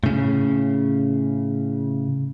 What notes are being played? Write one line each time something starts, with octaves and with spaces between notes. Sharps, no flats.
A2 C#3